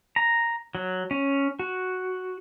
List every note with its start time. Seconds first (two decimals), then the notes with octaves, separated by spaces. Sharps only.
0.16 A#5
0.75 F#3
1.11 C#4
1.59 F#4